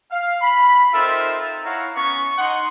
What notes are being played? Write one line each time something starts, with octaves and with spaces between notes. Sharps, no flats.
F5
B5
C4 D#4 F4 A4 A#4 E5
E4 C#5 F5 F#5 A#5
B3 C#4 C#6
D#4 F#5 C6